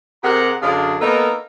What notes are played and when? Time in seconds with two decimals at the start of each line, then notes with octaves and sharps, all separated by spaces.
0.23 C3 G4 G#4 A#4 F#5 A#5
0.62 F#2 D3 D4 G#4 F5
1.01 A#3 B3 D#4 A4 A#4